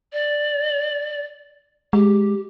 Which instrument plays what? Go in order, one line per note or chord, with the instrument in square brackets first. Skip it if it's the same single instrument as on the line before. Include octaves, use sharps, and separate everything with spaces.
[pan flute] D5
[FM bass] G#3 [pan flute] G4